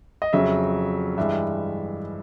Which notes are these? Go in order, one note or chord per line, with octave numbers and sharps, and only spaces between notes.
D#5
F2 C#3 F#3 E5
G2 E3 G#3 E5